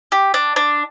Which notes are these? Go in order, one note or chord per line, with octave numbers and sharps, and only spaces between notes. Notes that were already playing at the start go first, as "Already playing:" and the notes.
G4
D4
D4